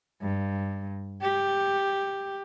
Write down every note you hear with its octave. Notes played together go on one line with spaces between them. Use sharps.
G2
G4